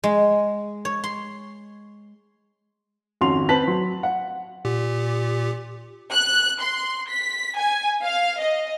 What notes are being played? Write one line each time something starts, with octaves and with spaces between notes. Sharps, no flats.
G#3
C#5
C6
G#1 F2 C#4 F#4 C6 F7
C4 B4 C5 A5 B6 F#7
F#3 C6
F#5
A#2 G4
F#6
C6
B6
G#5
F5
D#5